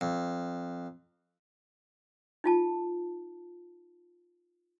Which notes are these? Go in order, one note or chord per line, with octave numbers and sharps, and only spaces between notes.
F2
D#4 F4 A5